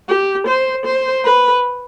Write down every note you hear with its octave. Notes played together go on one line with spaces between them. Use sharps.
G4
C5
C5
B4